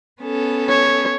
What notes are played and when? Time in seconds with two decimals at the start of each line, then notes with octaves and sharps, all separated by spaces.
0.20 B3 C#4 A4
0.69 C#5